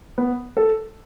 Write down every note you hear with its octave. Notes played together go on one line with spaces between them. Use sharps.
B3
A4